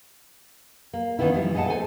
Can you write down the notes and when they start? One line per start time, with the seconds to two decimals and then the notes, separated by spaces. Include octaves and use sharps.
0.94 A#3
1.19 D#3 E3 B3 C#4 E4
1.34 F3 G3 E4
1.54 A#2 G#4 D#5 F#5 A5
1.67 A4 C5 G#5